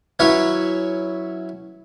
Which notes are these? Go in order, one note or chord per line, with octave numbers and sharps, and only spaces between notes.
F#3 C#4 E4 B4 C#5 E5